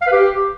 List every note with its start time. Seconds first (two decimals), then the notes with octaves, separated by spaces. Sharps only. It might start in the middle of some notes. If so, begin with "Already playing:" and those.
0.02 F5
0.07 B4
0.12 G4